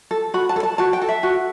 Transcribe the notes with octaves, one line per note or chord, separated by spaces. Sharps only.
A4
F#4 B5
A5
A4
A5
F#4 A5
G5
A4
E5
F#4